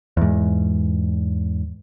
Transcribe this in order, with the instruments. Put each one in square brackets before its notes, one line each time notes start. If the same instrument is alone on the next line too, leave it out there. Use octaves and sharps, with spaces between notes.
[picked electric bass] E2 G#2